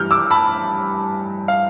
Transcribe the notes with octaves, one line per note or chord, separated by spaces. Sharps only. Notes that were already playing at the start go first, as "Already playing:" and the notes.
Already playing: G2 E3 G3 F6 G6
D6 E6
A5 B5
F5